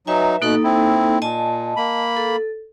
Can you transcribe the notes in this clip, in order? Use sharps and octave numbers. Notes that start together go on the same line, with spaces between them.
F#3 D#4 B4 E5 G#5
B2 A#3 D#4 A4 F#6
C4 E4
A#2 D#5 G#5 A5
A#3 B5
A4